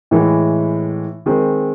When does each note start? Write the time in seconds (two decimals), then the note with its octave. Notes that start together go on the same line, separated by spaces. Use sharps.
0.11 A2 E3 G#3
1.26 D#3 G#3 C4